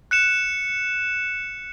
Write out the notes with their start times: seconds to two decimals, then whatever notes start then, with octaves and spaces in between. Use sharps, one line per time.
0.11 F#6 C#7 E7